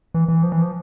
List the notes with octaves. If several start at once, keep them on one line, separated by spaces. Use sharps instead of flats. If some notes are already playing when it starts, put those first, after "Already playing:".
E3
E3
F3
E3
F3